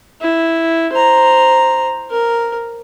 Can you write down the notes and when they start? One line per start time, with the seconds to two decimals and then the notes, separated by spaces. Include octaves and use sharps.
0.22 E4
0.93 C5 A#5
2.10 A#4